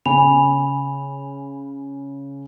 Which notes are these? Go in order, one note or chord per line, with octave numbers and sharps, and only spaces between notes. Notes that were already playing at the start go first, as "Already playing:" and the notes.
C#3 G#5 B5 F7